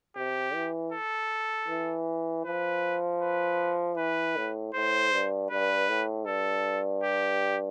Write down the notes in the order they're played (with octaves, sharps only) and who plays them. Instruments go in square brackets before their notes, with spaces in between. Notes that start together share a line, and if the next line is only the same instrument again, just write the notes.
[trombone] C3 [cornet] G4
[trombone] E3
[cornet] A4
[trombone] E3
[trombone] F3 [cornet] B4
[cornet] B4
[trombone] E3 [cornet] B4
[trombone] A2
[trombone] A2 [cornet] C5
[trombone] G2
[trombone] G2 [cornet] B4
[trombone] A2
[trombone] G2 [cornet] A4
[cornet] G4